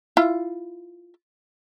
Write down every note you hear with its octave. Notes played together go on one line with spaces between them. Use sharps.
E4 F4